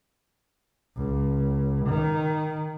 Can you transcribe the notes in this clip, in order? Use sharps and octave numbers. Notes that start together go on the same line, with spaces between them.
C#2
D#3